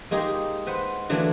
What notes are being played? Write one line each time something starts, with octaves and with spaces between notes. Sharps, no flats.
G#3 A#3 D#4 G4 G#4
B4 C5 F#5
D3 E3 F#3 A3 A#3 D4